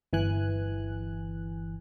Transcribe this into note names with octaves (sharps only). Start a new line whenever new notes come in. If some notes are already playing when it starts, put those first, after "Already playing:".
G1 E3 G#5 F#6